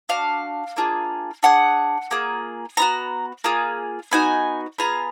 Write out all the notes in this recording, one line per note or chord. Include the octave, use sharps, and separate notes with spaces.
D4 F#4 F5
A#3 D4 F4 G#4
D4 G#4 F#5
A#3 F4 G#4
B3 D#4 F#4 A#5
A#3 F4 G#4
B3 D#4 F#4 G#5
B3 F4 G#4 A#5